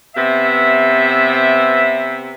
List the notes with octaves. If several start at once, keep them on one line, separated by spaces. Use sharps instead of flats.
C3 B3 C5 E5